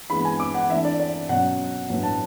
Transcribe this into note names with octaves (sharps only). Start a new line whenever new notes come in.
E3 G#3 B3 B5
G#5
D6
F#5
E3 A3 D4 E5
D5
D5
B2 F#3 C#4 F#5
A2 F#3 B3 D4
A5